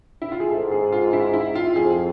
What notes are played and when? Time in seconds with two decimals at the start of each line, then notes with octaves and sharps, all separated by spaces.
0.22 E4
0.32 F4
0.40 G#4
0.50 G#2 A4
0.71 G#4
0.92 F4
1.13 E4
1.33 E4
1.55 F4
1.76 F2 G#4